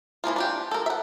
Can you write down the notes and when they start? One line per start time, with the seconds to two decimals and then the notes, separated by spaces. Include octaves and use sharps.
0.24 E3 F3 A#3 F4
0.36 D4 F4 G4
0.71 A4 A#4
0.86 E5 F#5